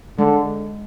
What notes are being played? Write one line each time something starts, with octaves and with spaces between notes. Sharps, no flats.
D3 G#3